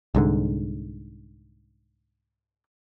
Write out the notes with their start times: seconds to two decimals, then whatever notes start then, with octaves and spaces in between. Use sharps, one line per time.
0.15 C2 G#2 D3